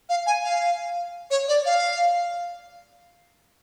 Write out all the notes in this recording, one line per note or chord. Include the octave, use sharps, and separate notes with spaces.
F5
G#5
F5
C#5
D5
F5